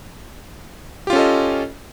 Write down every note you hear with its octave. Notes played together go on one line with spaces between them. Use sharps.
C#4 F4 G4 A4 D#5